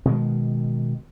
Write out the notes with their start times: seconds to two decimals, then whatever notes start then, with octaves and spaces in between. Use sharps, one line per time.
0.05 B2 D#3 G#3